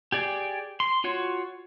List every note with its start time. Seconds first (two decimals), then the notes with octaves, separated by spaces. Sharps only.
0.12 G4 G#4 D5 G5
0.80 C6
1.04 F4 F#4 C#5